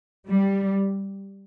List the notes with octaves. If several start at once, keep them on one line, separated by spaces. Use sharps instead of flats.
G3